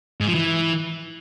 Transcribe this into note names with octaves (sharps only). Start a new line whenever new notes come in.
G#2
F3
E3